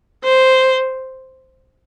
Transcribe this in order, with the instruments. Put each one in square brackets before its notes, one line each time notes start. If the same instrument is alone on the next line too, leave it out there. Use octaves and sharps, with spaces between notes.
[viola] C5